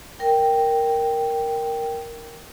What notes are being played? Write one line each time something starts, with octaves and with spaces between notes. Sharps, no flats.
A#4 G5